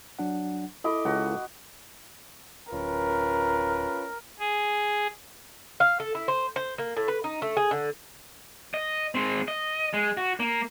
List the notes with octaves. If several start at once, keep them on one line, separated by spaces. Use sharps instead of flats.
F#3 D4 F#5
E4 A4 D#5 B5 D6
C#2 F#4
D1 C#4 F4 A#4 B4
G#4
F5
A4
E4
C5
C5
A#3
A2
B4
D#4
A3
G#4
D3
D#5
G#3 C4
D#5
G#3
F#4
A#3